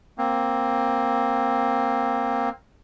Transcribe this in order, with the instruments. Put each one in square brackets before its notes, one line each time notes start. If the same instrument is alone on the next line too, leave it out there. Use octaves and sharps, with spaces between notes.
[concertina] A#3 C4